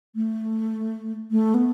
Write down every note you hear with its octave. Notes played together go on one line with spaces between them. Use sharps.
A3
A3
B3